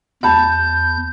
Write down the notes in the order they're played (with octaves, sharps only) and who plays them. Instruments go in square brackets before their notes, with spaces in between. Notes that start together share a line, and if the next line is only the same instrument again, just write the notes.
[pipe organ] E2 G6 [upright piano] A5 B5